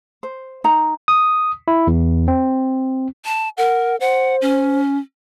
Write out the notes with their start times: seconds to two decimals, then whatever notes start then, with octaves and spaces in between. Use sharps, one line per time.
0.23 C5
0.64 D#4 A#5
1.08 D#6
1.68 E4
1.87 E2
2.28 C4
3.25 A5
3.58 A#4 F#5
4.00 C5 F#5
4.42 C#4